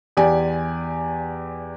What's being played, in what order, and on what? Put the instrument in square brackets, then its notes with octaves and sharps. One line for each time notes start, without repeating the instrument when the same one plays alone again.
[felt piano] E2 G4 D5 G#5